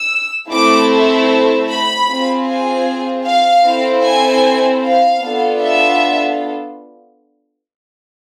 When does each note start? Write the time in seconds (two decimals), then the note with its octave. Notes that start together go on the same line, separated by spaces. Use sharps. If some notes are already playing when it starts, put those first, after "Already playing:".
Already playing: E6
0.50 A3 C4 E4 A4 D6
1.69 B5
2.08 C4 F4 G#4
2.48 G#5
3.26 F5
3.65 C4 E4 A4
4.05 G#5
4.84 F5
5.23 B3 D4 F4 A4
5.62 E5